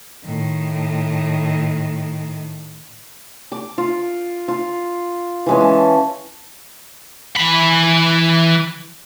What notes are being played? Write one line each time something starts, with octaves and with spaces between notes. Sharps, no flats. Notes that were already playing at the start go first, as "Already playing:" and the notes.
A2 D#3
D6
F4
F4
E3 G#3 C#4
A5
E3 B5